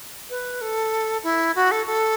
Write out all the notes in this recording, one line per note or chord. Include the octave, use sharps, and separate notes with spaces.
B4
A4
E4
F#4
A4
A4